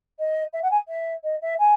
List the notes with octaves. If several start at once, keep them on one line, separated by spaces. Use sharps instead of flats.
D#5
E5
F#5
G#5
E5
D#5
E5
G#5